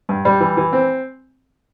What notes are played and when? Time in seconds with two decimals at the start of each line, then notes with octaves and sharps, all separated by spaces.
0.09 G2
0.25 G3
0.40 E3
0.57 E3
0.73 C4